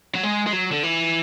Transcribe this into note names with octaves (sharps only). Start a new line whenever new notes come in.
F#3
G#3
G#3
F#3
D3
E3